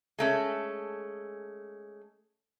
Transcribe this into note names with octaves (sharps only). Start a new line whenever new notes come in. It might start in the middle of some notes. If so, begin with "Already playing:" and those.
G#3 A3 C#4